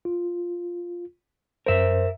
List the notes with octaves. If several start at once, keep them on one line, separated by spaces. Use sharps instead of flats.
F4
F#2 A#4 C5 E5